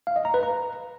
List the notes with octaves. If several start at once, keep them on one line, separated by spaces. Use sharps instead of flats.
F5
D#5
A#5
B4
A#5